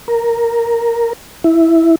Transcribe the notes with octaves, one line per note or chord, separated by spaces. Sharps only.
A#4
E4